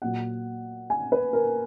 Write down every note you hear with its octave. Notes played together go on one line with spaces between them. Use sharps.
A#2 F#3 F#5
G#5
B4
A#4